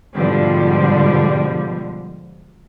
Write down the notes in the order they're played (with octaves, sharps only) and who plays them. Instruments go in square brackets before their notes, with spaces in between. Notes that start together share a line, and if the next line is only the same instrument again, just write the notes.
[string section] G#2 B2 D3 F3 G3